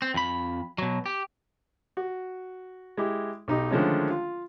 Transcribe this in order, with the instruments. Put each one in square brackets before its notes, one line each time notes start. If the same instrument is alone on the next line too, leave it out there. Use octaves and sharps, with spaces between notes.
[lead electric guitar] C4
F2 B5
B2 F#3
G4
[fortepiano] F#4
G#3 E4 G4
B1 D#4 G4
D3 D#3 F3 G#3 A3 C#4
F4